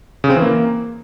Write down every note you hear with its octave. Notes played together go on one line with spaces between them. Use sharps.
C#3
C4
E3
A#3